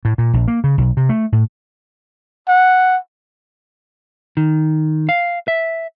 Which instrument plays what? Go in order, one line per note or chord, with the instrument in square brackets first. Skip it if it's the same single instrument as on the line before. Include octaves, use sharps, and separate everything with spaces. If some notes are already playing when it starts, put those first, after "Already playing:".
[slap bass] A2
A#2
A#1
A#3
C#3
B1
C3
A3
A2
[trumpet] F#5
[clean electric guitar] D#3
F5
E5